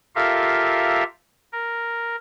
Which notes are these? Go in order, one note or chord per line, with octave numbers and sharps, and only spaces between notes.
F4 G4 A4 A#4 E5 F5
A#4